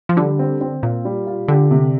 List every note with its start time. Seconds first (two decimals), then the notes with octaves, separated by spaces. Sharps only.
0.09 F3
0.17 D3 G3
0.39 C4
0.61 C4
0.83 A#2 F4
1.05 G3
1.27 F4
1.48 D3 G4
1.71 C3